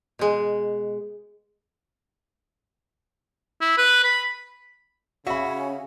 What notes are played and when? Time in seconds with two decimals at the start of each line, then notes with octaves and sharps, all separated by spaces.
0.19 B2 G#3
3.61 E4
3.78 B4
4.04 B5
5.27 C#3 C#4 F#4 E5 B5